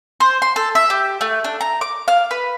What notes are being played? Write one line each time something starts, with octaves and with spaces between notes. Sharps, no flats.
C5
C6
A4
E5
G4
A3
D4
A#5
D6
F5
B4